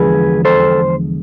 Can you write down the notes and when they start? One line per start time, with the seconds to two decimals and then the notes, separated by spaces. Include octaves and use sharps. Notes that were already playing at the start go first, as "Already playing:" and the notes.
Already playing: E2 D3 F3 G#3 G#4 B4
0.45 A4 C5